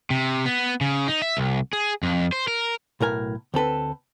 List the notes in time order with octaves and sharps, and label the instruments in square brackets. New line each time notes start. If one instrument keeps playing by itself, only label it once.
[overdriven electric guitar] C3
B3
C#3
D#4
E5
C2
G#4
F2
C5
A#4
[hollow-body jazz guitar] B1 A2 A#4 G#5
D2 C4 A4 B4